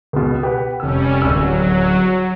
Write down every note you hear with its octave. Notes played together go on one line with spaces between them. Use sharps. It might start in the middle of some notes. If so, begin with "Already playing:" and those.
C#2 B2
G4 B4 F#5
F1 G3 C#4 E6
D1 G#1 F#3 E6